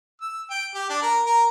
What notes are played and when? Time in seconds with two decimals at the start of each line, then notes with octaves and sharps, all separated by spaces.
0.21 E6
0.50 G5
0.75 G4
0.89 D4
1.02 A#4
1.26 A#4